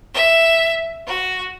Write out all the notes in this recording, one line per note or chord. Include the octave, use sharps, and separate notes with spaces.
E5
F#4